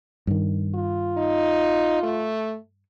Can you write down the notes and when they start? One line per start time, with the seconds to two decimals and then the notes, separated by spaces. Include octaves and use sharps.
0.27 G2 D#3
0.75 F4
1.17 D#4
2.03 A3